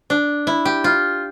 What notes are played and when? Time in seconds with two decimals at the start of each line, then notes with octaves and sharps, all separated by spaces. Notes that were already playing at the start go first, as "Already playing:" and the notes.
0.10 D4
0.47 E4
0.65 G4
0.84 F4